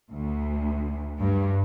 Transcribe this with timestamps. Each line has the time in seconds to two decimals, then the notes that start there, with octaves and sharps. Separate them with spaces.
0.12 D2
1.21 G2